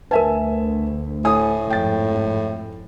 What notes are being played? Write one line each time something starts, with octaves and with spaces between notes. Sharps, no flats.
D2 A#4 B4 E5 G#5 A5
A2 G#5 D#6
F2 G#2 G5 A6